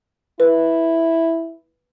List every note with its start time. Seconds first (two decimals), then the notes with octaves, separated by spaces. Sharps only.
0.40 E4 B4